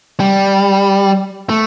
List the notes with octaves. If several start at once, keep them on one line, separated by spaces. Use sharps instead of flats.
G3
A3